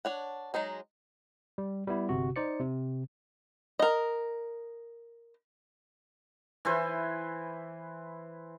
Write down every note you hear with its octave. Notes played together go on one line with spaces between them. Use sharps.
D4 C#5 F#5
F#3 G#3 D#4 G#4
G3
G3 B3 E4
G1 C3 F#4
D#4 C5 D5 C#7
C3
A#4 D#5
E3 E4 B4 C5